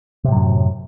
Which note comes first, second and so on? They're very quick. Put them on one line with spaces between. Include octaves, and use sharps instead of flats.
C3 A2 F#3 F#2